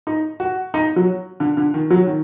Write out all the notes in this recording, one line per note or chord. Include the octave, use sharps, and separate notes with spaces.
D#4
F#4
D#4
F#3
D3
D3
D#3
F#3
D#3